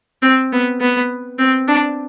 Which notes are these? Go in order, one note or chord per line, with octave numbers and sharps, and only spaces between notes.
C4
B3
B3
C4
D4